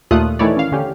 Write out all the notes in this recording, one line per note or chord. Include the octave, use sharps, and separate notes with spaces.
D#2 A#2 A3 F4 D#6 F#6
D#3 E3 A3 E4 C#5 D5
C#4 F5
D3 C#4 G4